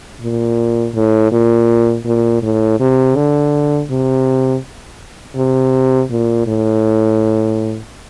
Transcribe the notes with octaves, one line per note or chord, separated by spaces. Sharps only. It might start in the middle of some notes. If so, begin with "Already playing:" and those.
A#2
A2
A#2
A#2
A2
C3
D3
C3
C3
A#2
A2